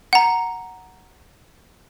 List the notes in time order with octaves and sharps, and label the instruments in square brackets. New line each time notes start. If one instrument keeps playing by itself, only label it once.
[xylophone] F#5 A#5